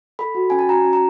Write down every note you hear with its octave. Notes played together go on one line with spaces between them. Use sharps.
A4 B5
F#4
C#4 G#5
A5
F#4 A#5
C#4
A#5